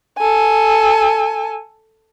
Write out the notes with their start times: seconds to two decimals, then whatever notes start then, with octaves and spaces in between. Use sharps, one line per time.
0.19 A4 G#5